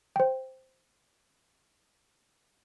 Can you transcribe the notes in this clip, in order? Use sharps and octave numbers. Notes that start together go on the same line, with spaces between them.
C5 G5